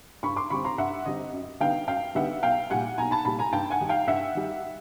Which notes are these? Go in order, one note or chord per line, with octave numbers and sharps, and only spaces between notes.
G2 B5 C#6
C6 D6
D3 G3 C4 B5 C#6
A#5 C6
G2 E5 F#5
D3 G3 C4 D#5
F#2
D3 G3 B3 D#4 F5 G5
F#2 F5 G5
D3 G3 B3 D#4 E5 F#5
B1 F5 G5
A#2 G3 F#5 G#5
B1 G#5 A#5
A5 B5
A#2 G3 A5 B5
G#5 A#5
G2 G5 A5
F#5 G#5
D#3 G3
F5 G5
G2 E5 F#5
D#3 G3